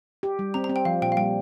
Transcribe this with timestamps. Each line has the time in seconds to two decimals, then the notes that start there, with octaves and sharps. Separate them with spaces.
0.23 G4
0.39 G3
0.54 C4 A#5
0.64 A#5
0.69 C4
0.76 G5
0.85 F3 F5
1.02 A#2 G5
1.12 F5
1.17 G3 G5